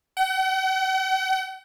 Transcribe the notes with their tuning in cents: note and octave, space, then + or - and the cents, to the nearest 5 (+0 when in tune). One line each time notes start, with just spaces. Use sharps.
F#5 +45